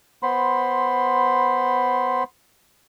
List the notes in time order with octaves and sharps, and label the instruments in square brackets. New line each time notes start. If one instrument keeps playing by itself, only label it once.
[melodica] B3 C5 B5 C6